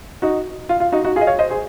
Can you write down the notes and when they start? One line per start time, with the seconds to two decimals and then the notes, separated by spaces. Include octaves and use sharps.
0.22 D#4 F#4
0.69 F4
0.80 F4
0.92 D#4 F#4
1.05 D#4 F#4
1.16 F4 G#4
1.21 D#5
1.27 C#5 F5
1.39 C5 D#5
1.50 G#4 C5